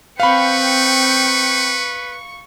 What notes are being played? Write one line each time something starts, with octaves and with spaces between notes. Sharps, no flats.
C4 B4 F5 G5 B5 C#6 C#7